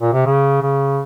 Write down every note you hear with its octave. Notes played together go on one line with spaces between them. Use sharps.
A#2
C3
C#3
C#3